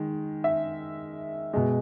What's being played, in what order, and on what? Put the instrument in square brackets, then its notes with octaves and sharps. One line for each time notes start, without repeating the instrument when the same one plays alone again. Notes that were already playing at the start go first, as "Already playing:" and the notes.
Already playing: [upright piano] D#3 G#3
E5
B2 G#3